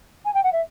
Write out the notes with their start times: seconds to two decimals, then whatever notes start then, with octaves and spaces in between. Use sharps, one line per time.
0.25 G#5
0.34 G5
0.43 F#5
0.52 E5